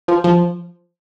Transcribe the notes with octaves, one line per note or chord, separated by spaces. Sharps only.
F3
F3